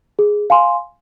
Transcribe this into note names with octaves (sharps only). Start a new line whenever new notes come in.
G#4
F5 G#5 C6